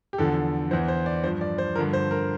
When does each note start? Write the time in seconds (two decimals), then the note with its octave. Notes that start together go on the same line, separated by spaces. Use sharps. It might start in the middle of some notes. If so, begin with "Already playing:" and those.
0.13 G4
0.18 E2 D3 F3 A4
0.71 E2 E3 C5
0.88 C5
1.06 D5
1.24 G2 F3 C5
1.41 D5
1.58 C5
1.75 G2 D3 F3 A#4
1.93 C5
2.11 A#4